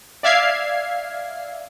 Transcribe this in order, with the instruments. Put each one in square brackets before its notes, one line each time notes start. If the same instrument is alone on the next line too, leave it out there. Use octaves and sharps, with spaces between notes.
[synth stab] D5 E5 F5 G#6 C7